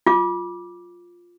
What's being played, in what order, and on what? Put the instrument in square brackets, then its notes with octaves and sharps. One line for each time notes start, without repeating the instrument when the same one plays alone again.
[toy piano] F4 D6